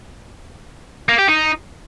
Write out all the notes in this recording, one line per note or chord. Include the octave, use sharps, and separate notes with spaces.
A#3
G4
D#4